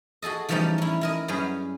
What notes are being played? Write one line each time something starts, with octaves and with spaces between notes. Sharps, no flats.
F#4 G#4 A4 D#5
E3 F3 G3 A3 C#4 D#4
C#4 E4
E4 A#4 D#5
F#2 G3 C#4 G#4 B4